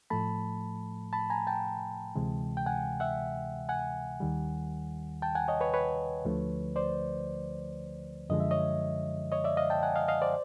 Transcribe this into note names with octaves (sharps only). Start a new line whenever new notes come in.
A2 F3 A3 A5 B5
A5 B5
G#5 A#5
G5 A5
D2 C3 E3 G#3
G5
F#5 G#5
E5 F#5
F#5 G#5
D#2 D#3 G3
G5 A5
F#5 G#5
C#5 D#5
B4 C#5
B4 C#5
D2 D3 F3 A3
C5 D5
F#2 D3 F3 G#3 D#5
E5
C#5 D#5
C#5 D#5
D5 E5
D#5 F5
G5 A5
F#5 G#5
D#5 F5
D#5 F5
C5 D5